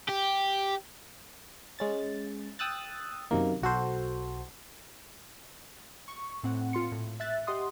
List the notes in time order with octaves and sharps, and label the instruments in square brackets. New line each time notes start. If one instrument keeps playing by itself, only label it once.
[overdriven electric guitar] G4
[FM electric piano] G#3 C#4 A6
G5 D#6 E6 F#6 A6
F#2 C3 D#3 A#3
B1 F#4 A4 C5
[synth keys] C#6
A2 C4 F#5
A#2 F4 C6 C#7
A2
E5 F#6 A6
G4 D#5 F#5 C6 D#6